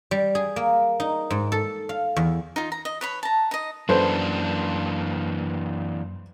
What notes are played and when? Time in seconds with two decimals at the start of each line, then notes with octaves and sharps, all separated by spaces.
0.11 G3
0.35 G#4
0.56 A#3
1.00 D#4
1.30 G#2
1.52 A4
1.89 F5
2.17 E2
2.56 D#4 F4
2.72 A#5
2.85 D#5
3.01 B4 C#5 B5
3.23 A5 A#5
3.51 D#4 D#5
3.89 F#2 E3 A#3 D4 A4 B4 C5